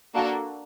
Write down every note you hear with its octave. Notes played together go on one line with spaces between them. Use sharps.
A#3 D4 F#4 A4